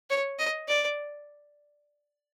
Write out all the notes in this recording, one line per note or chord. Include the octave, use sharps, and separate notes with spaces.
C#5
D#5
D5